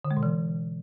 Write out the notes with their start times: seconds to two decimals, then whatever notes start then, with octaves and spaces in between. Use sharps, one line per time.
0.05 D3
0.11 G#3
0.17 B2
0.23 E3